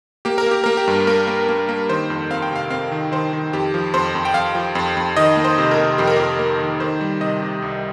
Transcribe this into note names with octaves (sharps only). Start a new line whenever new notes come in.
A#3 G4
A#4
A#3 G4
A#3 A#4
G4
G2
A#3 A#4
A#3
A#3
A#3
D#3 C5
F2
C4 F5
G5
C3 F5
C4 F5
D#3
D#3 C5
D#3
F2 G4
F3
F2 C5
F2
G5
F2 F5
F3
F2
F2
D#3 D#5
A#3
C5
C3
A#4
C3
F2 G4
A#4
F2 G4
A#3 A#4
D#3
D#3 C5
G3
C3 D#5
C3
C2